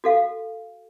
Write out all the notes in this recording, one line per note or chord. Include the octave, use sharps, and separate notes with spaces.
F#4 A4 F5